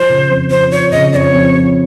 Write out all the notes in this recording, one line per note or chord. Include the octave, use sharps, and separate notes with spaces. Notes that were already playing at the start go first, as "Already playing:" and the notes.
Already playing: F3 C5
C#3
F2
F2 C5
F3 C#5
C#3 D#5
F2 C#5 D5
F2
F3